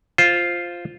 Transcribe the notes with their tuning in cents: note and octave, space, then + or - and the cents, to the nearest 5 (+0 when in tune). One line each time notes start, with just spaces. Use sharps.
F4 +0 C5 +0